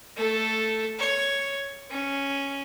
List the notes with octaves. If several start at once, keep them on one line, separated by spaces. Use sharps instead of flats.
A3 A4
C#5
C#4